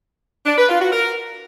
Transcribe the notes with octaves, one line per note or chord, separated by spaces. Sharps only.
D4
B4
F4
F#4
A#4